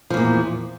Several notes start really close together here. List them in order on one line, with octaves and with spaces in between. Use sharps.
F3 E2 A#2